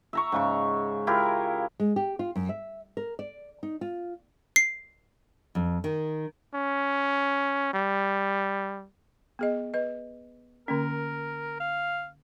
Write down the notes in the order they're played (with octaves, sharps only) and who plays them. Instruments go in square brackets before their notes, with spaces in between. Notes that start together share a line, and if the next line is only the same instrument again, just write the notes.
[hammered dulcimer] E5 A#5 C#6
G#2 C#3 C#6
E4 F4 G4 A#4
[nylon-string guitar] G#3
G4
F4
F#2
E5
A#4
D5
D#4
F4
[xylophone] C7
[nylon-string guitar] F2
D#3
[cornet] C#4
G3
[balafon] B3 G#4 D#5
B4 D#5
[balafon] D3 A#3 C#4 [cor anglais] A#4
[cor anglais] F5